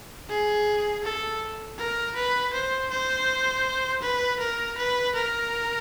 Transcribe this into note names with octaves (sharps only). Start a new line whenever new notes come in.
G#4
A4
A#4
B4
C5
C5
B4
A#4
B4
A#4